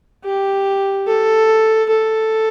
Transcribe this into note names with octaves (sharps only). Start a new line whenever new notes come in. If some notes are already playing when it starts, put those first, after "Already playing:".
G4
A4
A4